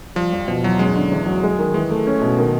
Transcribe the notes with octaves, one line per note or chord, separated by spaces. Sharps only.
F3 G3
F2
B2 F3
E2 F#3
G#3 C#4
D3
E2
F#3
G#3
D#3
E3 G#3
A3
C#4
B2
D#3